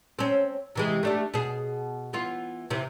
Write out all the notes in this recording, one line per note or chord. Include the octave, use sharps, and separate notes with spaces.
C4 C#4
C3 E3 G#3
A3 D4 G4
B2 G#4
E3 B3 F4
C3 E3